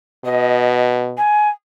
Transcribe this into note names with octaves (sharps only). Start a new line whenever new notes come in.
B2 D#5
G#5